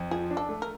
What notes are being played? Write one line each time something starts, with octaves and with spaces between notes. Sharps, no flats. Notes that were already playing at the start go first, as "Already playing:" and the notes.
Already playing: F2
F3 G#4
D4
A4
A3
A#4